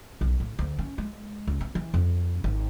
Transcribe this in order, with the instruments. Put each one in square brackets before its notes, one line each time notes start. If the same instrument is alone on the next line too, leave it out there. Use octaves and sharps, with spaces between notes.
[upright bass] B1
A2
D2
C#4
G#3
C#2
C4
E3
F2
G#1